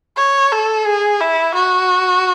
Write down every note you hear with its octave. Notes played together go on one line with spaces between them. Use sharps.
C#5
A4
G#4
E4
F#4